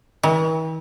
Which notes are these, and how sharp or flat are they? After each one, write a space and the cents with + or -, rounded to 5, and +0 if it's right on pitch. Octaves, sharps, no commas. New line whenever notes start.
E3 -45